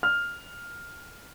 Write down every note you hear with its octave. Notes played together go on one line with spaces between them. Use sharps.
F6